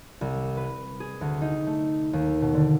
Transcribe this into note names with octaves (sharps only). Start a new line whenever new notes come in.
C2
B4
G#4
D2
D#4
A3
D#2
B2
D3